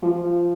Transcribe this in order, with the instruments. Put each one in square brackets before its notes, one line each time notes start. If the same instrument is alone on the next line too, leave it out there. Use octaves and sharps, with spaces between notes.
[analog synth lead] F3